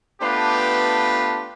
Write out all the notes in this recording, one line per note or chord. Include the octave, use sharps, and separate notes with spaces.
A3 B3 D4 F4 G4 B4